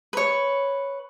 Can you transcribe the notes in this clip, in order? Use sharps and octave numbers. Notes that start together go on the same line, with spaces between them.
B4 C#5